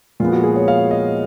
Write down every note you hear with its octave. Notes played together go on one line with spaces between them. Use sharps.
A#2 F3 G#3 B3 F4
F#4
G#4
C#5
F5
D#5